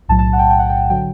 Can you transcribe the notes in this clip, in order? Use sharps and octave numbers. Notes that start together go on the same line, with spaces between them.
B1 A2 F#3 A5
A5
F#5
G5
G5
F#5
G5
D3 F#3 G5